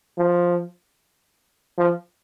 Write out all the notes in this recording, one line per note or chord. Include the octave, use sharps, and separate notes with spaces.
F3
F3